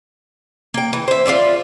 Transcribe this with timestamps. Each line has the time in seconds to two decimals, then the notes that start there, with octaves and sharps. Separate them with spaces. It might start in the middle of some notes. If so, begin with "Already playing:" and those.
0.74 A#3 G5
0.93 E3
1.08 C5 E5
1.26 F4 G#4 D5 E5